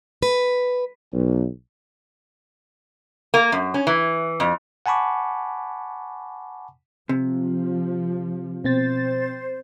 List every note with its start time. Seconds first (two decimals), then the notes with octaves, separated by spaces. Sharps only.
0.23 B4
1.13 B1
3.34 A#3
3.52 F#2
3.74 C#4
3.87 E3
4.40 F2
4.86 F#5 G#5 A5 B5 C#6 D6
7.09 C3 F3
8.64 B2 C4 C5 A6